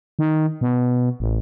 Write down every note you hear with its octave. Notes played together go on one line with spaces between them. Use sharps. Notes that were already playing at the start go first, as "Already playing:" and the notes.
D#3
B2
A1